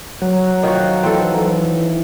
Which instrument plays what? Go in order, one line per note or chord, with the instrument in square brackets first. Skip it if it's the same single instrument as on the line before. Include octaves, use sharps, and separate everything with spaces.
[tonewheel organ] F#3
[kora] D#3 F3 F#4
[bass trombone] E3 [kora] C4 A4